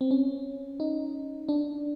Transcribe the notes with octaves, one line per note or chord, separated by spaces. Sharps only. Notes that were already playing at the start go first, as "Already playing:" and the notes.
C4
C#4
D#4
D4